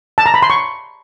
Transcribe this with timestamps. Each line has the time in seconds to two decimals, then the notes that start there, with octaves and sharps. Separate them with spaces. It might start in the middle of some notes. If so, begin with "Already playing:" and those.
0.18 A5
0.26 A#5
0.34 B5
0.42 C6
0.50 C#6